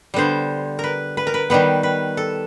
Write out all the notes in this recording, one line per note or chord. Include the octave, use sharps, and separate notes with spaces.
D3 G3 B3 C5
A#4 B4
B4
A#4
B4
D#3 G3 B3 B4
B4
A4